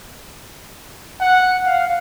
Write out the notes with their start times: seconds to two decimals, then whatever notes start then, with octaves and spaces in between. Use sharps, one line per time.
1.21 F#5
1.65 F5